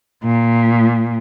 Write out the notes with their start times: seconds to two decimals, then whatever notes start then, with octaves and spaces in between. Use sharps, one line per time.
0.25 A#2